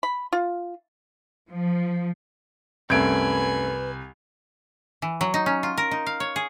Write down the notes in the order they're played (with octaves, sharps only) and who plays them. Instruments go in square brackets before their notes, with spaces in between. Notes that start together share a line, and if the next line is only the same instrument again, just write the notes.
[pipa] B5
F4
[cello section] F3
[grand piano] C2 D7 [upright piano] F#2 A3 G#6 [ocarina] B4 [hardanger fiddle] G#5 B5
[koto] E3
F#3
D#4
C#4
F4
A#4
D#4
F5
C#5
G#4